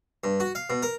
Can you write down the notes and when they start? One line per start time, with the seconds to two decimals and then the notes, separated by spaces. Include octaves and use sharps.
0.24 G2
0.40 F#4
0.55 F5
0.70 B2
0.83 A#4